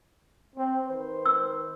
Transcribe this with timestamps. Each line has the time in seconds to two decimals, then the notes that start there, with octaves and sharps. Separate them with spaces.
0.56 C4
0.88 D#3 B4 C5
1.26 E6